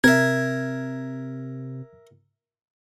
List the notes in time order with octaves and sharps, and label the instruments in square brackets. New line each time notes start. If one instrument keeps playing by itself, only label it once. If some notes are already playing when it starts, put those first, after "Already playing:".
[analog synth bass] C3 [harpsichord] A#4 E5 [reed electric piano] G#6